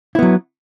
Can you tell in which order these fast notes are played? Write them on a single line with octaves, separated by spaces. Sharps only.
E4 B3 F#3